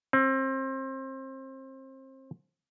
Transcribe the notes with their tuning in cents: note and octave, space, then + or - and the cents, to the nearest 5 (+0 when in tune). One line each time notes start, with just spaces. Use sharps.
C4 +30